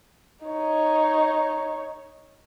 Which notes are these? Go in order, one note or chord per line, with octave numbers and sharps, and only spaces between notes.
D#4 C#5